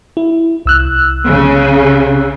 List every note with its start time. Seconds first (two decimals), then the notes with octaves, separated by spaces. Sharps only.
0.17 E4
0.66 C2 E6 F#6
1.26 C#3